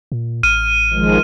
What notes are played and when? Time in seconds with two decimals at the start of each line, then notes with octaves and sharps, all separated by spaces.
0.12 A#2
0.43 A1 F6 D#7
0.93 D#3 F3 G#3